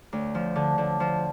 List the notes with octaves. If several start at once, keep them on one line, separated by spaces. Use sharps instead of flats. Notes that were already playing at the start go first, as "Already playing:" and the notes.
D2
F3
D3
D3
F3